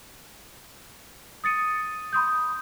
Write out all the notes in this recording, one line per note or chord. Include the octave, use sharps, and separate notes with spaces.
D#6 A6 C#7 D#7
B5 C6 D#6 G6